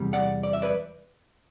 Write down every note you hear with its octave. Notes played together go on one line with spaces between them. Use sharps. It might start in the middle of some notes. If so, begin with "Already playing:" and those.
Already playing: E2 C3 G3
D5 F#5
D5
E5
B4 D5